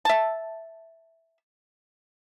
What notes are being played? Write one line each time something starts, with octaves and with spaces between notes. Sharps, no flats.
E5 A5